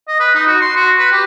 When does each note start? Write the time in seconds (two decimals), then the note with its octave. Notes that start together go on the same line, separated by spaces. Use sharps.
0.08 D#5
0.20 B4
0.35 D#4
0.47 F#4
0.61 C6
0.76 F#4
0.98 B4
1.12 G4